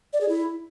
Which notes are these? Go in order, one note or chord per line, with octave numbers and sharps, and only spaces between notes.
D5
G#4
E4